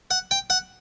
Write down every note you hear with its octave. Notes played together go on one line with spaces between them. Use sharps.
F#5
G5
F#5